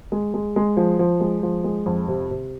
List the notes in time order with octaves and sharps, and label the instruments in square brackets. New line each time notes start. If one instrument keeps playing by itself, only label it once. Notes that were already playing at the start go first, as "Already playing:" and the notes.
[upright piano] G#3
G#3
G#3
F3
F3
G#3
F3
G#3
F2
C3
C3